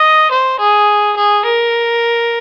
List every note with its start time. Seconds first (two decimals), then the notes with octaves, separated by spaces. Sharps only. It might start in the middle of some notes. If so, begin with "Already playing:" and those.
Already playing: D#5
0.31 C5
0.59 G#4
1.17 G#4
1.45 A#4